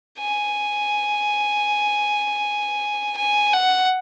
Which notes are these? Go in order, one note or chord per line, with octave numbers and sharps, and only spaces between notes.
G#5
G#5
F#5